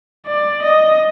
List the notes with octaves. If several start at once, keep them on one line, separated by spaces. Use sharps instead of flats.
D5
D#5